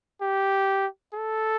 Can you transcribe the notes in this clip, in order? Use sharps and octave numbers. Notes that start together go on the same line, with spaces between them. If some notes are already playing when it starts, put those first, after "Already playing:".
G4
A4